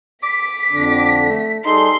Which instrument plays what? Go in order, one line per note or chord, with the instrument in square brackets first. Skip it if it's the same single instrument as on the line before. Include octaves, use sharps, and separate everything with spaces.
[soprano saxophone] D6 [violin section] B6
[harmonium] F2 D3 D4
[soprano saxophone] A3
[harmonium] G3 G#4 A4 [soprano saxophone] D#4 [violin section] C6